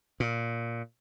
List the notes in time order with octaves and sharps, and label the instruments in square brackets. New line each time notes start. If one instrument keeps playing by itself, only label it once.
[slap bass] A#2